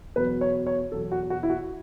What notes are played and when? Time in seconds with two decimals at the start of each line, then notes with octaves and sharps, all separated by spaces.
0.16 E2 B2 F#3 B4
0.41 C#5
0.66 C#5
0.92 E2 B2 F#3 A4
1.12 F#4
1.30 F#4
1.43 E4
1.50 F#4